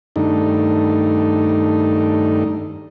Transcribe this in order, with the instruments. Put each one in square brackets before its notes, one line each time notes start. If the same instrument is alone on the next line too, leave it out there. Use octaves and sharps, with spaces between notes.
[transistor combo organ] G2 D#3 A3 D4 D#4